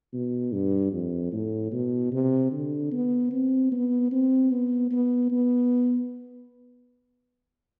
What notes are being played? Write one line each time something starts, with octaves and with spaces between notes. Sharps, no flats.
B2
G2
F2
A2
B2
C3
D3
B3
C4
B3
C4
B3
B3
B3